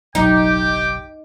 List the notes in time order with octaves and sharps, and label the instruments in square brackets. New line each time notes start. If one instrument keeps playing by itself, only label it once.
[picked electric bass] F#1 B1 F#3 [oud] D#4 [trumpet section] G4 G5 D6